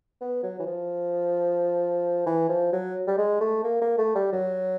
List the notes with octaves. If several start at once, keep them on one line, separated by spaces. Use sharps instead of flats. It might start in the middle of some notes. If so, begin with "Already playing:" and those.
B3
F#3
E3
F3
E3
F3
F#3
G3
G#3
A3
A#3
A#3
A3
G3
F#3